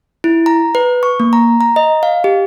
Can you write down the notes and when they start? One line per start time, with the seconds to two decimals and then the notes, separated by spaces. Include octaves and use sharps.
0.24 E4
0.46 A#5
0.75 B4
1.03 C#6
1.20 A#3
1.33 A#5
1.61 A#5
1.76 D#5
2.03 F5
2.24 G4